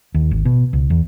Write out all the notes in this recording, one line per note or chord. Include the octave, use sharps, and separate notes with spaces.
D#2
G#1
B2
C#2
E2